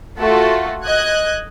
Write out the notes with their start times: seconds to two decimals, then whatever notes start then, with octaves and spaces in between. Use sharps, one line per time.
0.18 A3 F4 F#4 A4
0.84 D#5 F#6 G#6